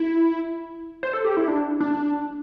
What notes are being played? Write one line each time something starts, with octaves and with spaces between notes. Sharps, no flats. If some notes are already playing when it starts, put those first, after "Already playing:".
Already playing: E4
C5
A4
G4
E4
D4
D4